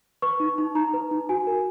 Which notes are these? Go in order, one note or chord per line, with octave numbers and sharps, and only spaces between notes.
B4 C#6
D#4
D#4
D#4 A#5
B4
D#4
F#4 G#5
A#4